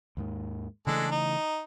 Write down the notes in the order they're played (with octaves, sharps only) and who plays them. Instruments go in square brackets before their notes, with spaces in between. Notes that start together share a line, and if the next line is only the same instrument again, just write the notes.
[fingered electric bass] D#2 G#2 D#3
[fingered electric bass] C#3 E3 A3 [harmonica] G#3 D4 A4
[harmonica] D#4